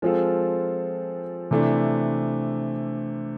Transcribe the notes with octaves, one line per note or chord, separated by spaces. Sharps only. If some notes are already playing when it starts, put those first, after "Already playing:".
F3 G#3 C4 F4 A4
C3 E3 A3 D4